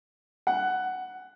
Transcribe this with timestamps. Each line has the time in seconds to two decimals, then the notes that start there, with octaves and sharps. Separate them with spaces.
0.47 F#5